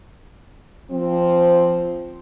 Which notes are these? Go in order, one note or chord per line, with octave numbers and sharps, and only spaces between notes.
F3 C4